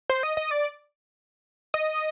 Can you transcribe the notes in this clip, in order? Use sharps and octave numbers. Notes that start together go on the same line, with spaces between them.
C5
D#5
D#5
D5
D#5